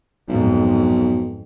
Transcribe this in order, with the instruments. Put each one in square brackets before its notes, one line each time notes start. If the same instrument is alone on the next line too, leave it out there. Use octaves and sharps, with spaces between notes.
[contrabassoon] B1 [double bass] F2 G#2